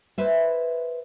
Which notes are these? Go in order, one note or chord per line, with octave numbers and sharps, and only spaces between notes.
B4 C5 E5